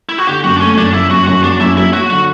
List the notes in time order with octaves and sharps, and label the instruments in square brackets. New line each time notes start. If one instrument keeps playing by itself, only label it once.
[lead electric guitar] E4
F#4
[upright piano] D3 [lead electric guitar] G4
[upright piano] F#2 [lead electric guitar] F#4
[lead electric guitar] D4
[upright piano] A3 [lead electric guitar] C#4
[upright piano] F#2 [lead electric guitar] D4
[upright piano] F#2 [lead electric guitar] E4
[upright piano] F#2 [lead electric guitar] F#4
[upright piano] F#2 [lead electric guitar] F#4
[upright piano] F#3 [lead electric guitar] D4
[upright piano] F#2 [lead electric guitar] E4
[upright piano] F#3 [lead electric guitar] E4
[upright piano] F#3 [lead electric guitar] F#4
[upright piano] D3 [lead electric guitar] F#4